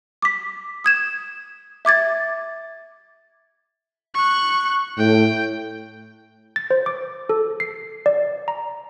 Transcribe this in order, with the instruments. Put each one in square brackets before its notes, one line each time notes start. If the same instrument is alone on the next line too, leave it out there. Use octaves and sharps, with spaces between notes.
[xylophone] D6 B6
D#6 G#6 E7
E5 D6 G#6 A6
[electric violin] C#6 F#6
[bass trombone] A2 [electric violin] G5
[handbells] A6
C5
D6
A4
C7
D5
A#5